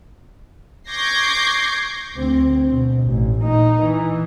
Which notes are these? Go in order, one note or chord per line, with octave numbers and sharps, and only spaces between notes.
C#6 D6 G6 G#6 A#6 C7
D2 C4
B2
A1
A#2 D#4
E3